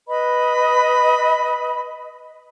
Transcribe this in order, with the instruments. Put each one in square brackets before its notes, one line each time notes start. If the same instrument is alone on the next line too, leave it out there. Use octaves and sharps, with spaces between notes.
[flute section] B4 D#5 B5